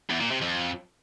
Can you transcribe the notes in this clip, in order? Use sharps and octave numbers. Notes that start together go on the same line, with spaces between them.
E2
A#2
C3
F2